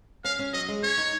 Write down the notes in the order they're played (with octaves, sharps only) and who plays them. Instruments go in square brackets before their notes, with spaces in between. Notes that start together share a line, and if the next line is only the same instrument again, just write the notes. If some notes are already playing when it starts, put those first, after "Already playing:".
[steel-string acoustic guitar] C#4 [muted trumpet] F5
[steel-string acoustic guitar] C#4
[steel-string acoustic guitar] F#3 [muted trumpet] D#5
[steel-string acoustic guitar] G#3
[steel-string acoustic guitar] C#4 [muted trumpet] C#5
[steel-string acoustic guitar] D#4